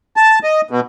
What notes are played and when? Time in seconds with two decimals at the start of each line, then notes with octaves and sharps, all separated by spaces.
0.16 A5
0.43 D#5
0.70 B2